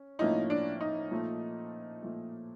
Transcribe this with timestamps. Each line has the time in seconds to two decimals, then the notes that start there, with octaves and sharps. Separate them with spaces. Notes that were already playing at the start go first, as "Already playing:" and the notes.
Already playing: C#4
0.19 A2 F3 A#3 C#4 D#4 E4
0.50 D4
0.81 D#4
1.11 A#2 F3 A3
2.02 A#2 F3 A3